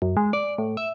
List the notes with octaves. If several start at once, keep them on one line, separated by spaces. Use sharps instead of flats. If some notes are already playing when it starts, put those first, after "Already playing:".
F#2
G#3
D5
A2
E5